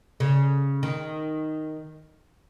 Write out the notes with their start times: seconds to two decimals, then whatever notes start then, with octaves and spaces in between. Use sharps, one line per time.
0.20 C#3
0.83 D#3